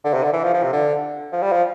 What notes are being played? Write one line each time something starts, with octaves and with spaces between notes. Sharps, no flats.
D3
C3
D3
E3
F3
F3
C3
D3
F3
G3
F3